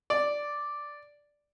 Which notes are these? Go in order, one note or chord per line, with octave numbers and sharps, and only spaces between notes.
D5